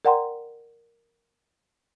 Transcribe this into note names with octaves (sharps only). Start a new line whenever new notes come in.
A#4 D5 F#5 G5 A#5 C6